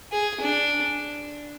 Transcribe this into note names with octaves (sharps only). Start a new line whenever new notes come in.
G#4
D4